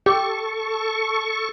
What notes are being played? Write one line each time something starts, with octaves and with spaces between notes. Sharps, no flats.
G4 A4 C#6